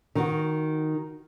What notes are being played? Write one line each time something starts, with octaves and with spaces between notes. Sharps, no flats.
D#3 F#4